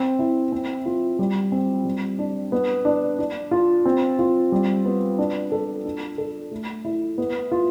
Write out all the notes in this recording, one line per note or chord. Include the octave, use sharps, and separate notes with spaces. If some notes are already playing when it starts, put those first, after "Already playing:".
Already playing: C4
E4
C4
F4
G3
C4
G3
D4
B3
D4
D4
F4
C4
F4
G3
B3
D4
A4
D4
A4
A3
E4
B3
F4